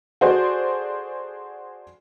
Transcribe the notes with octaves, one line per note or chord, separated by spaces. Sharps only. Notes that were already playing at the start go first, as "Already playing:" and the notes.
F#4 G#4 A4 C5 D5